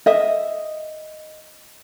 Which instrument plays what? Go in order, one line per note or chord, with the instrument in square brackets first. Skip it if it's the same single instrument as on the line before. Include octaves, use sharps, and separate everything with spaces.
[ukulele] D#5 E5